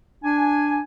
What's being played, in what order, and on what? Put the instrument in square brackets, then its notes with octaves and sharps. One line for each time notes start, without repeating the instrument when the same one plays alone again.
[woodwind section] D4 G#5